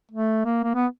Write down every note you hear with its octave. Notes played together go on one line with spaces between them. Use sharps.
A3
A#3
A#3
B3